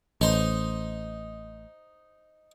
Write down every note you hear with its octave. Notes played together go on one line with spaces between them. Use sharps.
A1 D#4 C5